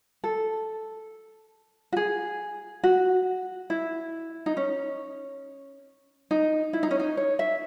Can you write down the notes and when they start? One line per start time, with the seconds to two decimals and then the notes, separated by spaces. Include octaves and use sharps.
0.24 A4
1.92 F#4
1.97 G#4
2.83 F#4
3.70 E4
4.46 D#4
4.57 C#4
6.31 D#4
6.73 E4
6.83 D#4
6.91 C#4
7.00 D#4
7.17 C#5
7.39 E5